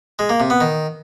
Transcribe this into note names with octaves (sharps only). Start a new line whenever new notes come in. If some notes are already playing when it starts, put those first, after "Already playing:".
G#3
A#3
C3
B3
D#3